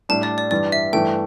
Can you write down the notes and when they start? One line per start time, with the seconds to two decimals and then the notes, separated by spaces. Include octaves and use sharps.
0.09 A2 G3 D4 A5
0.23 D5
0.38 D5
0.51 G2 E3 G3 D5
0.72 E5
0.93 G2 E3 A3 G5